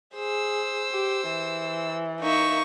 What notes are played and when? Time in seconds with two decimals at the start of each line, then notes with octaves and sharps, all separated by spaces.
0.16 G#4 C5 E6
0.92 G4
1.29 E3
2.21 A#3 D#4 E5 C#6